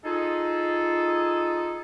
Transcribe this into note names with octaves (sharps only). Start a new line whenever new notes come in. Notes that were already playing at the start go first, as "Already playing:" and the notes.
D#4 F4 G#4 A4